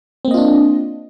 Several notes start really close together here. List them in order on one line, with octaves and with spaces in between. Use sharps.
C4 A#3 D#5 F4 D4